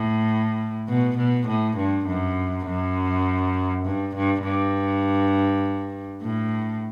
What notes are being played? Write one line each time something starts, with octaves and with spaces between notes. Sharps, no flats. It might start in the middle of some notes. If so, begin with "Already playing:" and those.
Already playing: A2
B2
B2
A2
G2
F#2
F#2
G2
G2
G2
A2